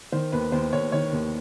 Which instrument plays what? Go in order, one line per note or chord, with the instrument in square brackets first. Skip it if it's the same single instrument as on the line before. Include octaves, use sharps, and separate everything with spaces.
[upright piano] D#3 C5
D#2 B4
D#2 C5
D#2 C#5
D#3 C#5
D#2